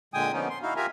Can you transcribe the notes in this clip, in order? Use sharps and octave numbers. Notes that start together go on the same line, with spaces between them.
A#2 D3 G#3 G5 G#5 D#6
D3 F3 A#3 B3 C#4 D#4
C6
D#4 E4 F#4 F5
F4 G4 A#4 E5 G#5 A#5